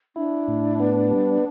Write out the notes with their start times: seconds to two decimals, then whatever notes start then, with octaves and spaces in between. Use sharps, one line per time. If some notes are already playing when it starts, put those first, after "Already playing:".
0.16 D4 E4
0.48 A2
0.80 B3
1.10 G3